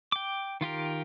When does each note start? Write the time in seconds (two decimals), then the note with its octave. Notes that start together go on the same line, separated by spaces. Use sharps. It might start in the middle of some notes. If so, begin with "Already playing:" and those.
0.12 G5 D6
0.61 D#3 F4 G4 A#4